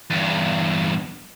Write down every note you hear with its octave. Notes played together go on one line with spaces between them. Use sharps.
E2 G2